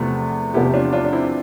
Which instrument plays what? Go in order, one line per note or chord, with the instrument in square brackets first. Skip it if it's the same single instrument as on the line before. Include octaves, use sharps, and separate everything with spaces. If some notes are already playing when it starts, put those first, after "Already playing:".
Already playing: [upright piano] E2 C3 F3 B3 [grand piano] A3 C4
[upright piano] E2 C3 F3 B3 [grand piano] E4 G4
[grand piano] D4 F4
D4 F4
D4
C4 E4